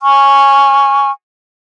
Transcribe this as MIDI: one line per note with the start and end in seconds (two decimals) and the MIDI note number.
0.02 1.10 80
0.02 1.10 85
0.02 1.10 89